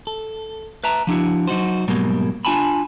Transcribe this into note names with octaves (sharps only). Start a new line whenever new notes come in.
A4
B4 E5 A5 A#5
F3 D4 E4 F#4
F#3 D#4 F#4 C5
G#2 B2 F#3 G3 A#3
D4 F4 G#5 A5 B5